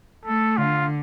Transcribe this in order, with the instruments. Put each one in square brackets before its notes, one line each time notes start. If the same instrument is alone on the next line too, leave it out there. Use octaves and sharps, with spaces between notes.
[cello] A3 [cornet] A4
[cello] D3 [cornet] F4